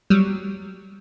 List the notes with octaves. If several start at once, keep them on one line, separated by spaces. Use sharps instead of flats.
F#3 G3